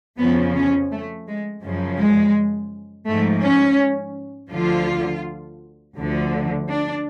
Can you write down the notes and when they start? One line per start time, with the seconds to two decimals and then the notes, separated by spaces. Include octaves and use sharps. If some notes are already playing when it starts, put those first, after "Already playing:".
0.18 F2 C#3 F3 B3
0.56 C#4
0.92 A3
1.28 G#3
1.64 F#2 C#3 F3
2.00 G#3
3.08 G#2 F3 A3
3.44 C#4
4.53 D2 D3 F3 F4
5.98 D2 D3 F3
6.70 D4